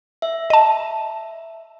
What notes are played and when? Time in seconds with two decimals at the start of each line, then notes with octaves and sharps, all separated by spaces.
0.22 E5
0.50 D#5 A5